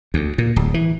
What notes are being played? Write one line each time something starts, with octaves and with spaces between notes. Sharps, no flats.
D2
A#2
D1
E3